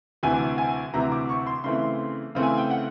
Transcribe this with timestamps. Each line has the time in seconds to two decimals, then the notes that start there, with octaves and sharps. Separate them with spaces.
0.23 D2 C3 E3 G#5
0.58 G#5
0.93 D2 C3 E3 A#5
1.12 D6
1.29 C#6
1.47 C6
1.64 C#3 E3 A3 C4 C6
2.35 C#3 E3 A3 C4
2.43 G#5
2.57 G5
2.71 F#5